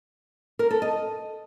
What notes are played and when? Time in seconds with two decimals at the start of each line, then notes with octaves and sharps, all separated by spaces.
0.59 A#4
0.71 A4
0.82 D#5